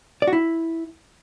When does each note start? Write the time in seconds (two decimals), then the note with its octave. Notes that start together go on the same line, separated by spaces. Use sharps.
0.22 D5
0.27 F#4
0.33 E4